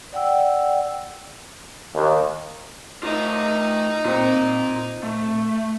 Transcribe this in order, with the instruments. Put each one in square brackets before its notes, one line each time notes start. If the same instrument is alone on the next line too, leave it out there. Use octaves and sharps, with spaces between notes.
[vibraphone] D5 F#5 G5 E6
[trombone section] D#2
[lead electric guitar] A3 F4 [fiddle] D#4
[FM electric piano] A#2 C4 [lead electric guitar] F4 A#5
[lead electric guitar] A3